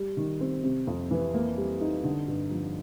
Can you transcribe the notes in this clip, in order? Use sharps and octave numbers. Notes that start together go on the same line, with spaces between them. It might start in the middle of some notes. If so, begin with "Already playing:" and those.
Already playing: G3
D#3
C4
C3
F2
E3
A#3
G3
D#4
D3
G2
F3